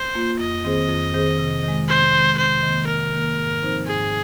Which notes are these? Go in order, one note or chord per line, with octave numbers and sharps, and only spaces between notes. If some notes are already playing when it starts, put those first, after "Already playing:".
Already playing: C5
A#3 F4
F2 D#5
D#3 C4 G#4 C5
F2
D#3 C4 G#4 C5
C3
D#3 G#3
C3 C5
D#3 G#3
C3 C5
D#3 A#3
C3 A#4
D#3 A#3
G#2
F3 C4 D#4 C5
G#2 G#4